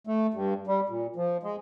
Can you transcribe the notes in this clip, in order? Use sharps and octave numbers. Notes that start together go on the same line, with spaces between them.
A3
G2
G3
A#2
F3
G#3